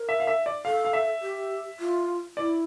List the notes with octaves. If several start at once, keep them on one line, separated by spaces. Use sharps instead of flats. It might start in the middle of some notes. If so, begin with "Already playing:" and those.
Already playing: A#4
E5
F5
E5
D5
A4 F5
F5
E5
G4
F4
E4 D5